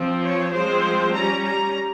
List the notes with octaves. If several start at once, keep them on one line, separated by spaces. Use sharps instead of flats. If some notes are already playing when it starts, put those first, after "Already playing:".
Already playing: F3 C4
C#5
F3 G#3 C4 C5
G3 C#4 A#5
A#5